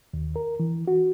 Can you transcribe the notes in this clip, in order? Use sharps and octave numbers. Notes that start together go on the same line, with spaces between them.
D#2
A#4
E3
F#4